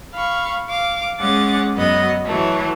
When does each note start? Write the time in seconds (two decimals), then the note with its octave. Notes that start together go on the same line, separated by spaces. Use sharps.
0.13 F5 B5 C#6
0.69 F5 D6
1.19 G#3 C#4 F#5 D6 A6
1.74 F#2 F#3 B3 D#5
2.24 E3 F#3 A3 C#5